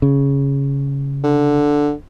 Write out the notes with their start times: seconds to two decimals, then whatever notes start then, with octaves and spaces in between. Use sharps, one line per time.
0.02 C#3
1.24 D3